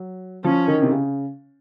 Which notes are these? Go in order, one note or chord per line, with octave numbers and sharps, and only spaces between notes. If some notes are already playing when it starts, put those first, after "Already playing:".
Already playing: F#3
F3 C#4
D#3
C3
C#3